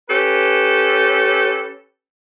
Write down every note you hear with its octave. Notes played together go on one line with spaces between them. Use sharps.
C#4 G4 A4 B4